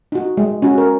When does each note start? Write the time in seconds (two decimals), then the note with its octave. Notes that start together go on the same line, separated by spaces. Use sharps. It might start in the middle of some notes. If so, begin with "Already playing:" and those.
0.12 D#4 F#4
0.37 G#3
0.62 C#4 F#4
0.78 A#4